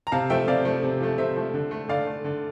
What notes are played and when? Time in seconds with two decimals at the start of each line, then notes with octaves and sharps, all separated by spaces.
0.07 A#5
0.12 C3 F5 A5
0.30 F3 A3 E5 G5
0.48 C3 D5 F5
0.65 F3 A3
0.83 C3
1.01 F3 A3
1.18 C3 C5 E5
1.36 F3 A3
1.54 D3
1.71 A3
1.89 D3 D5 F5
2.06 A3
2.24 D3